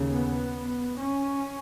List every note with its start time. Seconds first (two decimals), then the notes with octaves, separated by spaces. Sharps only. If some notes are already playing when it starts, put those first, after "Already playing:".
Already playing: D#2 C#3
0.11 B3
0.97 C#4